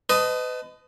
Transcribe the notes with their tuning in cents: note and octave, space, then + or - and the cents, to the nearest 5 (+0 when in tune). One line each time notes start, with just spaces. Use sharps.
B4 +40 D#5 +0 A5 +0